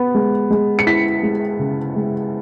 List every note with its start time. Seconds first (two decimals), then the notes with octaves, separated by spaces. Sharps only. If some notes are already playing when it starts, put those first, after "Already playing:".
Already playing: B3
0.15 G#3
0.51 G#3
0.79 C#7
0.87 E4 B6
1.23 G#3
1.59 C#3
1.96 G#3